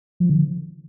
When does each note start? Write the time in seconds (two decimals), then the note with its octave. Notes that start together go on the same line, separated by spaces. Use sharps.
0.20 F3
0.29 D3